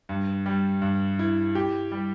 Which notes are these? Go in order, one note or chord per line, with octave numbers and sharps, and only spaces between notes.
G2
G3
G2
E4
G4
G3